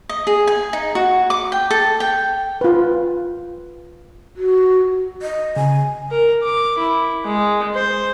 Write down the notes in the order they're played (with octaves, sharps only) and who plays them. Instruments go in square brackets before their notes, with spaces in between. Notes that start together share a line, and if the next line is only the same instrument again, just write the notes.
[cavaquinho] D#5
G#4
G#5
D#4
F#4
D6
G5
A4
G5
[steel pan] F4 B4
[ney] F#4
[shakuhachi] D#5
[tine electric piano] C#3 [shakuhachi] G#5
[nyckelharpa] A#4
D6
E4
G#3
C5